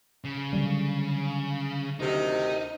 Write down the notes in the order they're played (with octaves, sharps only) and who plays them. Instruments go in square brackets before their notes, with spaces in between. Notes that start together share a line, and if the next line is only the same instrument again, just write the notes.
[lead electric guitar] C#3
[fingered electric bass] D3 F#3 G3
[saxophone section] D2 C3 D#3 [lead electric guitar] D#4